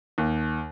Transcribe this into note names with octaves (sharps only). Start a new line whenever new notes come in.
D#2